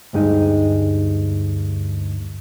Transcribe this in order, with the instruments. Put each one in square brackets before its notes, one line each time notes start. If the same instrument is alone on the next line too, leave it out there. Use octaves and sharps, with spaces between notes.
[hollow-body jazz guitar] D2 G2 G#3 D#4